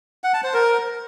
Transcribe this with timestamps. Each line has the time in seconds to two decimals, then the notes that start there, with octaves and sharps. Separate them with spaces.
0.24 F#5
0.34 A5
0.44 C5
0.54 A#4